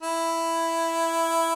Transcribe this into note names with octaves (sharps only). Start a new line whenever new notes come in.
E4